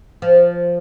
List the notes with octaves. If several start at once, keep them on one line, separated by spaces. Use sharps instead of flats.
F3